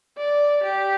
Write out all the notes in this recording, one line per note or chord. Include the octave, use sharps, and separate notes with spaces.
D5
G4